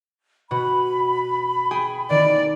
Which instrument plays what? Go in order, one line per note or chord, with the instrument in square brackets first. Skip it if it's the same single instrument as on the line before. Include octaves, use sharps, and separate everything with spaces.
[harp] B2 F#4 [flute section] B5
[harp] G#4 G5 G#5
[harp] D#3 [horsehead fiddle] D5